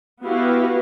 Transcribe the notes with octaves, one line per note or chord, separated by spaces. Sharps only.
B3 E4 F#4 G4 B4 F5